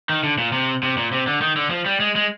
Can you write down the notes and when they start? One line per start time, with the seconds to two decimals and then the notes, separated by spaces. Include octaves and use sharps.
0.10 D#3
0.23 D3
0.38 A#2
0.53 C3
0.83 C3
0.97 A#2
1.12 C3
1.27 D3
1.41 D#3
1.56 D3
1.70 F3
1.86 G3
2.00 G#3
2.16 G#3